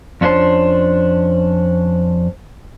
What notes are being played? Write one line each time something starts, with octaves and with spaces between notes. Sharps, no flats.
F2 C#4 D4 E4 C5 A5